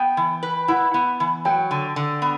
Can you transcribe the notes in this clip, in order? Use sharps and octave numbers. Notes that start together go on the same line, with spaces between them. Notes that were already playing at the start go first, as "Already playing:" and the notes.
Already playing: B3 G5
E3
B4
E4 F#5
B3
E3
F#3 G5
D3
D3
B3